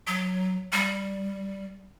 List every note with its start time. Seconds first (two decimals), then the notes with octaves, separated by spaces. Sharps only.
0.07 F#3
0.72 G3